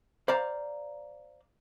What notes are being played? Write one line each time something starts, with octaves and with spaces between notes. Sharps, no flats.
C5 D5 F5 A#5